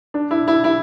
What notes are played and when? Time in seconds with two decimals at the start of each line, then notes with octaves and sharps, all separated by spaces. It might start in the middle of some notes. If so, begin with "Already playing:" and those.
0.14 D4
0.31 E4
0.48 E4
0.64 E4